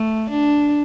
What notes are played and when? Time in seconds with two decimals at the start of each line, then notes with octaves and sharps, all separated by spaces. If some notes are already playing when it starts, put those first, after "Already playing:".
Already playing: A3
0.30 D4